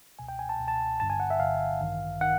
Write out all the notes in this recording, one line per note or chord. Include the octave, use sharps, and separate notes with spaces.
C#2 B2 G#5
G5
G#5
A5
C#2 B2
A5
G1 G2 D3 A5
G#5
F#5
E5
G1 G2 D3 F5
A1 G2 D#3
D#3 F#5